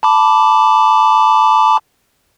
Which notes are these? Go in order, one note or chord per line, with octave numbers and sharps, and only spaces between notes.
A5 B5 D6